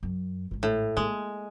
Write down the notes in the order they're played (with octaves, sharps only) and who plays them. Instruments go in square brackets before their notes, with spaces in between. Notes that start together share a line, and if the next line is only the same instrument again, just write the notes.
[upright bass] F#2
A1 G#2
[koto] A2
[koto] G#3 [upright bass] A#3